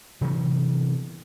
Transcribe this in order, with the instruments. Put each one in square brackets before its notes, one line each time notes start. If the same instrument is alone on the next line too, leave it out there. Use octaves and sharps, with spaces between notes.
[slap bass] C3 E3 F#3 B3